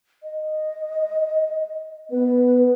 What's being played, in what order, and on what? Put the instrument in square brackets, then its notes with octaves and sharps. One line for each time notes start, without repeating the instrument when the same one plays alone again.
[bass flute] D#5
[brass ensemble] B3 [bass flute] B4